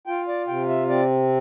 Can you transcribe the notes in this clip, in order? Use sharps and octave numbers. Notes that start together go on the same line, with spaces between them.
F4 G5
D5
C3 G5
E5
C4 D5